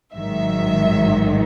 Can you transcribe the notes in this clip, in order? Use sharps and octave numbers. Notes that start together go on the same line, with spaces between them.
A1 G#2 D#3 F#3 E5